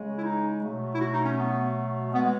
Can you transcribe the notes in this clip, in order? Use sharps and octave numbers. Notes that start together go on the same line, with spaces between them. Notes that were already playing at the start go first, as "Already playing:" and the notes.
Already playing: C#3 G#3
E4
D#4
B2 F#3 A3
E4
F#4
D#4
C#4
B3
B2 G#3 B3